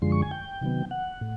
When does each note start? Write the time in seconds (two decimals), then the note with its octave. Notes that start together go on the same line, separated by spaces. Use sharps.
0.02 F#2 D3 F3 G#3 C6
0.12 C#6
0.22 G#5
0.31 G5
0.61 C3 D#3 F#3 B3
0.91 F#5
1.21 A2